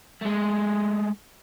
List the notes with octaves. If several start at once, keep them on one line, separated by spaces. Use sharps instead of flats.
G#3 A3